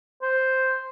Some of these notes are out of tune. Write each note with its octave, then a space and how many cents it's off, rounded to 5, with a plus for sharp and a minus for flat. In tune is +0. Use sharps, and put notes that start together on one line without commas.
C5 +0